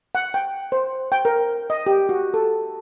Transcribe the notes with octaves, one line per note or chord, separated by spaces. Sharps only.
F#5
G5
C5
G5
A#4
D#5
G4
F#4
A4